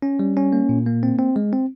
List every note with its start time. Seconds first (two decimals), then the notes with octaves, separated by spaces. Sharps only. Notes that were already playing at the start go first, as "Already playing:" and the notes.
0.02 C#4
0.19 G3
0.37 C#4
0.53 A#3
0.69 A#2
0.86 A#3
1.03 C4
1.19 C4
1.36 G#3
1.53 C4